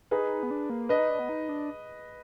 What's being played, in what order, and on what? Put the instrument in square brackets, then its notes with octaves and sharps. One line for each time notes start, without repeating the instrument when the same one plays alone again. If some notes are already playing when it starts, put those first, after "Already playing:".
[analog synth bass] D#4 [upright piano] G#4 B4
[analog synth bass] B3
D4
A#3
[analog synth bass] D4 [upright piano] B4 D#5
[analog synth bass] D#4
D4
B3
D#4
D4